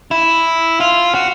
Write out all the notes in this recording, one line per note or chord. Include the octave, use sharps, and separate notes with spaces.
E4
F4
F#4